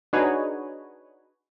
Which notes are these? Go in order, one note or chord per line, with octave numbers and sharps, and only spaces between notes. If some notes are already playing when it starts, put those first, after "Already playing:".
D4 D#4 F#4 G#4 B4 C#5